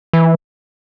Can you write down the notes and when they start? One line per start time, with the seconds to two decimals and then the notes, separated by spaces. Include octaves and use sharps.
0.13 E3